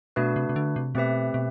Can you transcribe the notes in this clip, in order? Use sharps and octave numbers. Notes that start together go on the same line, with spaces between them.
B2 A3 D4 F#4 B4
C3
C3
D3
C3
B2 A3 C4 G4 B4 E5
B2